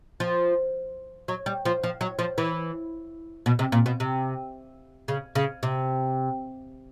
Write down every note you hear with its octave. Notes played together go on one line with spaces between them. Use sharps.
F3
F#3
G3
F3
F3
F#3
F3
E3
B2
C3
A#2
B2
C3
C#3
C#3
C3